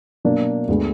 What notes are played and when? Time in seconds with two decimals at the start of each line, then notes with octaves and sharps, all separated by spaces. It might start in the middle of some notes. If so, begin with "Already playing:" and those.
0.25 B2 F#3 A#3 D4
0.68 D2 D3 G#3 B3